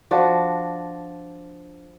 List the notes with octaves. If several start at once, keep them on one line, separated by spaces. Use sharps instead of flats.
F3 D4 F#4